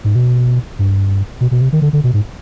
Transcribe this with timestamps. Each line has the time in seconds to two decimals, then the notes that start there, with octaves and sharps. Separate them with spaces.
0.04 G#2
0.15 B2
0.79 G2
1.41 B2
1.51 B2
1.61 C3
1.72 D#3
1.82 D3
1.93 D3
2.04 B2
2.14 G#2